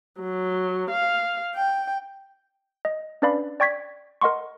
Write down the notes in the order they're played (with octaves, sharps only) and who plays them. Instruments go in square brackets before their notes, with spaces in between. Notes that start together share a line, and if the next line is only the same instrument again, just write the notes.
[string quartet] F#3
F5
G5
[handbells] D#5
C#4 D4 B4 D5 F5 B5
D5 G5 C#6 G#6 B6
A#4 D#5 F#5 C6 C#6